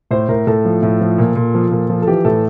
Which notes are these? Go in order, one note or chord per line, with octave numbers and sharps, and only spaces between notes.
A2 C5
A2 A#4
A2 A4
F3
A2
F3
A#2
A#2
F3
A#2
F3
A4
E3 G4
A2 A4